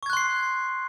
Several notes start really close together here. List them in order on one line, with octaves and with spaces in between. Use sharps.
C#6 G#6 F#6 C6 C7